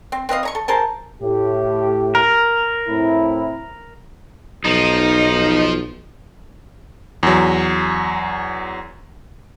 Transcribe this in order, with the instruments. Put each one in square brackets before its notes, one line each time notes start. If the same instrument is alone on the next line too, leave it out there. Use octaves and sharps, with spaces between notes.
[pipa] C4
C4 B4 D#5 F5
C#5 A#5 C#6
A4
G#4 A#4 C5 A5
[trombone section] A2 G4
[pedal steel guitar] A#4
[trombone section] A2 C4 E4
[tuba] B1 [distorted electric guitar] F3 [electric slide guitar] D#4
[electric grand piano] E2 F#3